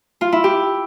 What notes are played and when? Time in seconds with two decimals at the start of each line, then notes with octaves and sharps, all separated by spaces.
0.21 F4
0.32 E4
0.44 G4